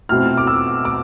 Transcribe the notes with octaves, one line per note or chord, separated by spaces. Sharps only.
B2 A3 C4 E4 F6
D6
E6
D6